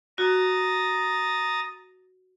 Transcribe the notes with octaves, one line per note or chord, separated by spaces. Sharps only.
F#4 A#5 D#6 A6